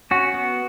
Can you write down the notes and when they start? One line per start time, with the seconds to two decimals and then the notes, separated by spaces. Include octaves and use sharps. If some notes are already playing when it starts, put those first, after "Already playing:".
0.11 C#4 F#4
0.34 B3